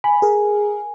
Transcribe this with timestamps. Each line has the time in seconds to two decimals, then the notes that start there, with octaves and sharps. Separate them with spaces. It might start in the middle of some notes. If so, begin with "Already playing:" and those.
0.04 G#5 B5
0.22 G#4 A#4